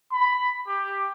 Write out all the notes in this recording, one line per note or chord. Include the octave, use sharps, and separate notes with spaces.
B5
G4